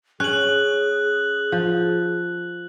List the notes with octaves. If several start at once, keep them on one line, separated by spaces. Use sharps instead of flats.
C#4 G#4 F#6 F#7
F3